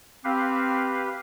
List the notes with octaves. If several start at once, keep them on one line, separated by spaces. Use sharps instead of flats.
C4 G4 B4 F5